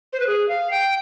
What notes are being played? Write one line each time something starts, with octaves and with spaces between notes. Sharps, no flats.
C5
B4
G#4
F5
G5